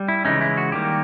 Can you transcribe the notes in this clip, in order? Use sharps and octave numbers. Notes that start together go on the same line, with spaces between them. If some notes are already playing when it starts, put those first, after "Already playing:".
Already playing: G3
E4
C#3 E3 G#3 C#4 D#4
E4
F#4
D#3 G3 A#3 G4